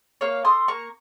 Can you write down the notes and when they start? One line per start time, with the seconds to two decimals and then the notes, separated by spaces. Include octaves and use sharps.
0.21 A#3 C#5 F5
0.45 A4 C6 D#6
0.68 A#3 A#5 C#6